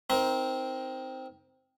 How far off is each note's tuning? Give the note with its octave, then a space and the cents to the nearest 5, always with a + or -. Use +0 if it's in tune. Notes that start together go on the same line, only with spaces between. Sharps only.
C4 +0 D#4 +20 A#4 +20